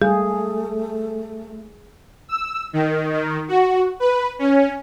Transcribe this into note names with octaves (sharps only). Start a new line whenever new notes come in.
G3 A3 G#4
E6
D#3
D#3
F#4
B4
C#4